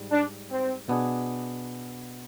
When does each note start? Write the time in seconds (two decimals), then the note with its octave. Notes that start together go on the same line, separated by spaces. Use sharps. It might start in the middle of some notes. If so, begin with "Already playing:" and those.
Already playing: G#2 G3
0.12 D4
0.51 C4
0.89 B2 B3 D4 G#4